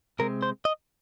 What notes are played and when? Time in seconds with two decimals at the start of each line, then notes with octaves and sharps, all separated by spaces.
0.19 C3 G#3 C4 A#4
0.42 C5
0.65 D#5